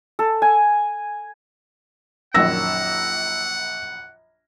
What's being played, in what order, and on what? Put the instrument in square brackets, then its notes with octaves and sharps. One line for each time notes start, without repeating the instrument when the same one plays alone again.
[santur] A4
G#5
[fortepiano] A#1 F#2 D#3 [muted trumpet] F#5 [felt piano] E6 A#6